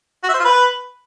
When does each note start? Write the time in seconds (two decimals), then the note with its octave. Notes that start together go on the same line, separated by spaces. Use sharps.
0.23 F#4
0.29 E5
0.34 C5
0.39 F4
0.44 B4